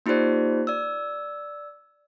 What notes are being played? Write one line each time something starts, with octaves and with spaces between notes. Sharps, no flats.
A#3 D#4 F4 G4 C5 D5
D5 E6